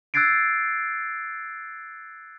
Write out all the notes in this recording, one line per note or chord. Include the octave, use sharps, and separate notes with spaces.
E6 F#6 G#6 A6 C7 D7